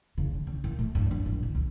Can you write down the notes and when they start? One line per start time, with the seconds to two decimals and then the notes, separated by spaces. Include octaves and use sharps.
0.18 C#3
0.33 D3
0.47 C#3
0.64 A#2
0.79 A3
0.95 G2
1.11 D4
1.26 A#1
1.43 D3
1.55 C#2